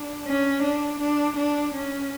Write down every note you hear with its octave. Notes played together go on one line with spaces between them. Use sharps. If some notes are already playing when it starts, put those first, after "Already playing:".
Already playing: D4
C#4
D4
D4
D4
C#4